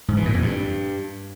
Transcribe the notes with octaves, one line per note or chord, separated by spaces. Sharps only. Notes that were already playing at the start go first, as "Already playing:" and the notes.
G#2
E3
A#2
F2
G2